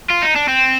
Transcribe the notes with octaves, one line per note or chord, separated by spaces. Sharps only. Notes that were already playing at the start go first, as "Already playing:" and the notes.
F4
D#4
D4
C4